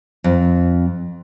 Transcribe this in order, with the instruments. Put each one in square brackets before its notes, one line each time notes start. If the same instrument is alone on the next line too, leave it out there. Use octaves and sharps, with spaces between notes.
[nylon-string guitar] F2